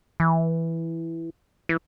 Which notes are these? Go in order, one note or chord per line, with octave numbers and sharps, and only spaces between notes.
E3
E3